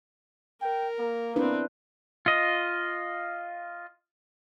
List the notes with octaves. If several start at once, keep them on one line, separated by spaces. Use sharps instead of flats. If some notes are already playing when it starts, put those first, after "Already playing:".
A#4 G5
A#3
B3 C4 D4 E4 B4
F4 D#5